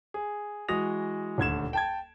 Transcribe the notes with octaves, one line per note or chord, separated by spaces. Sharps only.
G#4
E3 G#3 F#4 D#6 A#6 F7
D#1 D2 G#6 E7
G5 A5 G#6